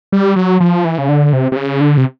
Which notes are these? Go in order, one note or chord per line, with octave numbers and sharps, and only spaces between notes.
G3
F#3
F3
E3
C#3
D3
C3
C3
C#3
D3
C3